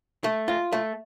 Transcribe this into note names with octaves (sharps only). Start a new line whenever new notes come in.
A3
F4
A3